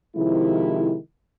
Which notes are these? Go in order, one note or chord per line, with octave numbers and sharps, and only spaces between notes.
C3 D#3 F3 G#3 E4